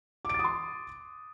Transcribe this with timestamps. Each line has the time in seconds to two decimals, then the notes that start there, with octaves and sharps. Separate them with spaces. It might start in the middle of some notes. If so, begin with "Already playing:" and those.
0.25 D6
0.29 D7
0.34 A6
0.39 D#6
0.44 C6